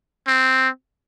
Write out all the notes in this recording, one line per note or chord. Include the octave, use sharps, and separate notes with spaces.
C4